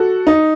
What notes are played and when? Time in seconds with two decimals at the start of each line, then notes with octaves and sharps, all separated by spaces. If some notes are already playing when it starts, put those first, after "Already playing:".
Already playing: F#4 A4
0.27 D#4